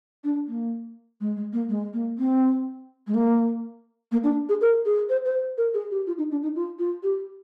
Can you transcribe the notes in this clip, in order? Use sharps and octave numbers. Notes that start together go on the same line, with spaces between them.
D4
A#3
G#3
G#3
A#3
G#3
A#3
C4
G#3
A#3
A#3
D4
G#4
A#4
G#4
C5
C5
A#4
G#4
G4
F4
D#4
D4
D#4
F4
F4
G4